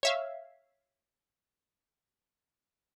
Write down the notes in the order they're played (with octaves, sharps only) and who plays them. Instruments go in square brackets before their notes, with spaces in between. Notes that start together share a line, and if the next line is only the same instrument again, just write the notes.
[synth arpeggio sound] C#5 E5 F5